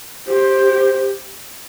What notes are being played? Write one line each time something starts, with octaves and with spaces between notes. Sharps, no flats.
G4 C5